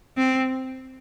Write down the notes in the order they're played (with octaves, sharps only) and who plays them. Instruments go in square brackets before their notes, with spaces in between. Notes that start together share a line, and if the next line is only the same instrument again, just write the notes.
[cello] C4